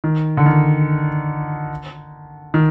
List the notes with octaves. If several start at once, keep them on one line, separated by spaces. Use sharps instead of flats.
D#3
D3
D#3
D#3